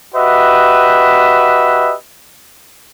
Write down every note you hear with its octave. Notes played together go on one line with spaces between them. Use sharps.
F#4 G4 B4 D#5 E5